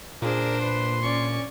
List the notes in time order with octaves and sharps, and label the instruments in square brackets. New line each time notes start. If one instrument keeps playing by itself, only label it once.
[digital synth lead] A#2 [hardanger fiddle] D4 C5 [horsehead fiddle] G#4 [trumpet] A#4
[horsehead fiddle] B4 [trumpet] C6
[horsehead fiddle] C#4 D5 [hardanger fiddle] C#6